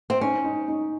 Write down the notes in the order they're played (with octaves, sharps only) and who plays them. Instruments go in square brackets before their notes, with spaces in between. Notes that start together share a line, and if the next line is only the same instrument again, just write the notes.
[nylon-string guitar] C4
[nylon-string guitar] C#4 [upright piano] D#4
[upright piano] D#4
D#4